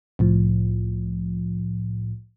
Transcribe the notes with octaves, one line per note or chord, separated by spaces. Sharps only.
C2 A2 F3